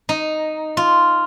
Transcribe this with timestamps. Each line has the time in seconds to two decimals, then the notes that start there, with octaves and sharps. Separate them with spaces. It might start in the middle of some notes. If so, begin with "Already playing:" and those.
0.09 D#4
0.77 F4